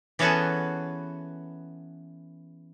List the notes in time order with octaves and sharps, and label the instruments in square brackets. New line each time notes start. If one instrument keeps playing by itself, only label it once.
[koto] E3 B3 C#4 F#4 G#4 A4